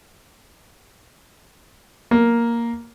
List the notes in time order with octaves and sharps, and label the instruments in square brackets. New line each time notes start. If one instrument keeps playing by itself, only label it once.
[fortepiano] A#3